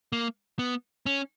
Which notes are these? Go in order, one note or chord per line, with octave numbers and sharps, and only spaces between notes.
A#3
B3
C#4